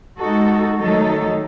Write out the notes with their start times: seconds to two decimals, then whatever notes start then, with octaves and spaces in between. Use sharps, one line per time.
0.19 G#3 D#4 F#4 A4
0.78 D#3 F#3 A3 D#4 A4